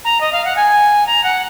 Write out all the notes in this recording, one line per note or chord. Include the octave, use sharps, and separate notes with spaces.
A#5
D#5
F5
F#5
G#5
A#5
F#5